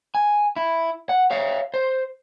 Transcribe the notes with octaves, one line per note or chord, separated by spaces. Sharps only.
G#5
E4
F#5
C#5 E5 F5
C5